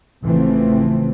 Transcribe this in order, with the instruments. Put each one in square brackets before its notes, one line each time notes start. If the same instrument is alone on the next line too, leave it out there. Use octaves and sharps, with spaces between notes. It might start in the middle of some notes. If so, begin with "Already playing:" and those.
[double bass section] A1 C#3 E3 F3 A3 C4